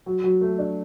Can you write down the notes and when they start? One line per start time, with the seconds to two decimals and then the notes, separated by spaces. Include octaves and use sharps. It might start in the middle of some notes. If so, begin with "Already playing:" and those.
0.06 F#3
0.24 F#3
0.41 A3
0.59 D4